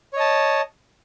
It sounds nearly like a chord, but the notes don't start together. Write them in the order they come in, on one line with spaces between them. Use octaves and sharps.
C#5 D#5 A5